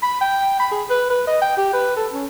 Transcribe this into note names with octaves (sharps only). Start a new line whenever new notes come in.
B5
G5
B5
G#4
B4
B4
D#5
G5
G4
B4
A4
C#4